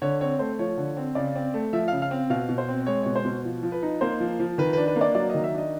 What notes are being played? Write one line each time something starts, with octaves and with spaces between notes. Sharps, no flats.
D3 C#5
C4 C#5
A3 C5
F3 C#5
D3
C4
C#3 D5
C4
A3
F3 E5
C#3 F5
F5
C4
B2 F5
B2
C5
C4
G#3 C#5
B2 C#5
C5
B2
F3
F3
B4
D#4
A#3 C5
F3
F3
D#3 B4
D4 B4
B4
A#3
D5
F#3 D5
D#3 D#5
E5
D4 D#5